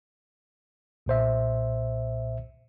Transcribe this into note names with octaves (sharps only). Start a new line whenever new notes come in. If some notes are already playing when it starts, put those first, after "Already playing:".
B1 A#2 C5 E5